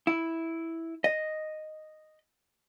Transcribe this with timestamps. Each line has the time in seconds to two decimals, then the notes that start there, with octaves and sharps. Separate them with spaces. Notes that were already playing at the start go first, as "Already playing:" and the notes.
0.07 E4
1.04 D#5